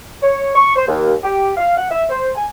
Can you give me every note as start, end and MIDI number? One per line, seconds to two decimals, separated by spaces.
0.23 0.51 73
0.55 0.75 85
0.76 0.87 72
0.88 1.14 39
1.24 1.52 67
1.57 1.75 77
1.77 1.90 78
1.91 2.04 76
2.10 2.29 72
2.35 2.47 80